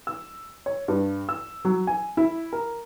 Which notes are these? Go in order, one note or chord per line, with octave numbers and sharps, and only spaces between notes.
E6
C#5
G2
E6
F#3
G#5
E4
A#4